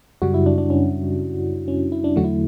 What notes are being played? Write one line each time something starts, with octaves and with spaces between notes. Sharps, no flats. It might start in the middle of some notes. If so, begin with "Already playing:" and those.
F#2 C#3 G3 F#4
E4
D4
D4
C#4
C#4
E4
D4
E2 D3 F#3 A3 F#4
E4